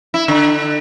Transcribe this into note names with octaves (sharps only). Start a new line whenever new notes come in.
E4
D3